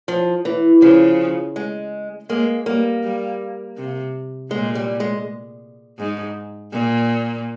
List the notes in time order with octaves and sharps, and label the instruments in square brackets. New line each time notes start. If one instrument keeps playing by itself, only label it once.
[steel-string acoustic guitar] F3
E3
[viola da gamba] C#3 [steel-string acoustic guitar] F3
[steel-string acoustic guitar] G#3
[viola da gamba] G#3 [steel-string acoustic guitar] A#3
[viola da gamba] G3 [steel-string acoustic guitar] A#3
[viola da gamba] G3
C3
[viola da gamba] A#2 [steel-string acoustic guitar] G#3
[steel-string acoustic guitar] G3
G#3
[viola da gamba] G#2
A#2